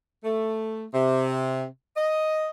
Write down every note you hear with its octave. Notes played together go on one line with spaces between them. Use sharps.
A3
C3
D#5